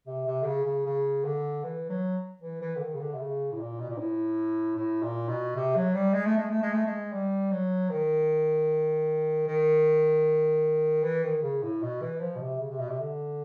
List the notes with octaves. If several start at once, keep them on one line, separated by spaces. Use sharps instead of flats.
C3
C3
D3
C#3
C#3
C#3
D3
E3
F#3
E3
E3
D3
D#3
C#3
D3
C3
C#3
A2
A#2
B2
A#2
A2
A2
A#2
B2
C3
F#3
G3
G#3
A3
G#3
A3
G#3
A3
G#3
G3
F#3
D#3
D#3
E3
D#3
C#3
A2
B2
E3
F3
B2
C3
C#3
C3
B2
C3
D3